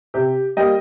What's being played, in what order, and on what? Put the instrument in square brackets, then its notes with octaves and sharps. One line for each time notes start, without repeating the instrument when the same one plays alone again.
[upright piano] C3 G4
G3 A#3 D#5 G5